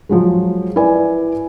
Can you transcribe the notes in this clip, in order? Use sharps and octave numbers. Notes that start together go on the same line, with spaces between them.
F3 F#3 G#3
E4 B4 D5 G#5